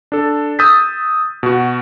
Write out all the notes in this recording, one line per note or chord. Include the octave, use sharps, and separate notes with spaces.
D4 A4
D#6 E6 G6 A6 B6
B2 F#4